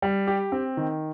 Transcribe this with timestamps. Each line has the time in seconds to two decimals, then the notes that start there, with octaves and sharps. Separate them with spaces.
0.02 G3
0.27 G4
0.52 C4
0.77 D#3